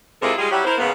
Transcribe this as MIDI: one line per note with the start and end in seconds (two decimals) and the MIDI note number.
0.22 0.32 48
0.22 0.32 56
0.22 0.32 64
0.22 0.32 65
0.22 0.32 69
0.22 0.32 70
0.37 0.49 55
0.37 0.49 56
0.37 0.49 65
0.37 0.49 68
0.51 0.63 54
0.51 0.63 55
0.51 0.63 64
0.51 0.63 66
0.51 0.63 67
0.65 0.75 64
0.65 0.75 70
0.65 0.75 72
0.78 0.90 44
0.78 0.90 49
0.78 0.90 58
0.78 0.90 59